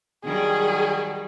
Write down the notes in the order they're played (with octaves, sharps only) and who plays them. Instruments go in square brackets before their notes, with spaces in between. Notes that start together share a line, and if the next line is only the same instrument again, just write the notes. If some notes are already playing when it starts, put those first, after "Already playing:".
[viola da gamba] D#3 F#3 G3 [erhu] G#4